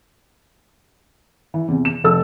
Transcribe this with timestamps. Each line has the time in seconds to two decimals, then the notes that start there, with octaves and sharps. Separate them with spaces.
1.54 E3
1.68 E2 C3
1.85 E7
2.04 F1 A4 E6